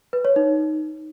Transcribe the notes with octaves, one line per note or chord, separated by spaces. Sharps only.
B4
C#5
D#4